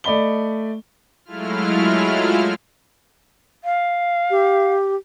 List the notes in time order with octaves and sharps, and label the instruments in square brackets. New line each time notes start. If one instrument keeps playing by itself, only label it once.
[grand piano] A3 D5 D#5 B5 G7
[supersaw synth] F#3 G#3 A3 E4 F4 F6
[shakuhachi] F5
[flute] G4